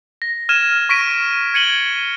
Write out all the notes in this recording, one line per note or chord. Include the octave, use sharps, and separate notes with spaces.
A#6
F6 G#6 D#7 E7
C#6 A#6 B6 D7 D#7
G#6 C#7 D#7 F#7 G7